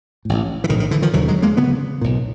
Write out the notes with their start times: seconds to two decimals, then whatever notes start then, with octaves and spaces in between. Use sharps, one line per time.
0.25 A1 A2
0.64 E3
0.69 A#1 A2 D#3
0.80 D#3
0.91 D3 E3
1.02 D#3 F3
1.13 E1 D#2 D3 E3 F#3
1.28 F#3 G#3
1.42 G#3 A#3
1.57 D2 C#3 A3 B3
2.01 B1 A#2